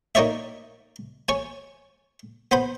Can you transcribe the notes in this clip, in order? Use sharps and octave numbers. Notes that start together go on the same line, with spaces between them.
A#3 D#4 C#5 D5 E5
C#5 G#5
B3 C5 B5